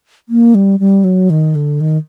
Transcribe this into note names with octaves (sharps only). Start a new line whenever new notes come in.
A#3
G3
G3
F#3
D#3
D3
D#3